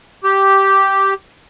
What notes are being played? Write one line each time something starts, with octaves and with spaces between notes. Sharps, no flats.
G4